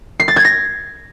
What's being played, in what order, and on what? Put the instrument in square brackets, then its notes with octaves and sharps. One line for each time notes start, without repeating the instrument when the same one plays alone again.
[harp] C7
A6
G#6
A#6